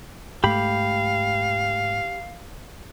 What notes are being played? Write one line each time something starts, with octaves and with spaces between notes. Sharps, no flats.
G#2 A3 G4 F5 B5